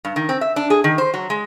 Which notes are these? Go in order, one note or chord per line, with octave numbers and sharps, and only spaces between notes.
G2
D#3
C4
E5
D4
G#4
D#3
C5
F#3
G#3